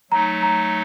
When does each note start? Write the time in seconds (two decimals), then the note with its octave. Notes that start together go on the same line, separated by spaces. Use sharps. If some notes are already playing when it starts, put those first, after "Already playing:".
0.11 F#3 A3 D#4 A#5
0.43 A#5